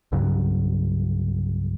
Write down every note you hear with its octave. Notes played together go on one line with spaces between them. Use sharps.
C2 G2 C#3 F#3